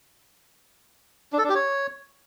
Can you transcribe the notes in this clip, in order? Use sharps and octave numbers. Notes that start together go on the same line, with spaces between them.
D4
A4
D4
G4
C#5